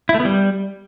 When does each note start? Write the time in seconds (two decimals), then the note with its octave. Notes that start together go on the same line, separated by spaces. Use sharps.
0.09 E4
0.14 A3
0.20 B3
0.25 G3